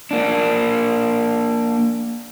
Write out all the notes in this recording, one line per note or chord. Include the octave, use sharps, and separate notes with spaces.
A#3 D4